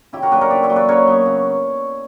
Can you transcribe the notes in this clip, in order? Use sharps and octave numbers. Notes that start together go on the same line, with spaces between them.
C#3 E4 G4
F#4 A#4
F#3 A#3 D4 G4 B4
A#4 C#5
C#3 B4 D5
C#5 E5
F#3 A#3 D4
B4 D5
C#3 A#4 C#5
F#3 B3
C#3